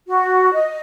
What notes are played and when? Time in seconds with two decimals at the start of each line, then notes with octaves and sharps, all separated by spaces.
0.08 F#4
0.53 D#5